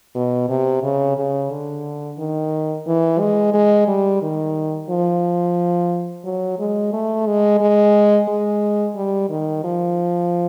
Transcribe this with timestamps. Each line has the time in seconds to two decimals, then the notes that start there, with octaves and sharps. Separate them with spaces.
0.15 B2
0.49 C3
0.83 C#3
1.17 C#3
1.51 D3
2.18 D#3
2.87 E3
3.20 G#3
3.54 G#3
3.88 G3
4.22 D#3
4.89 F3
6.25 F#3
6.59 G#3
6.93 A3
7.27 G#3
7.60 G#3
8.28 G#3
8.96 G3
9.30 D#3
9.64 F3